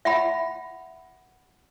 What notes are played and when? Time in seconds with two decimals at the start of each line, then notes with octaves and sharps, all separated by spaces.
0.05 E5 F#5 B5